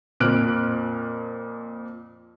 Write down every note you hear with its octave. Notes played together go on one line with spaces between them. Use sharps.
F2 A#2 F6 F#6 D7